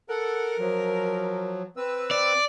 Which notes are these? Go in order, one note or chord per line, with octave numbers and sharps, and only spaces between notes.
A4 A#4 F#5
F3 F#3
C4 B4 E6
D5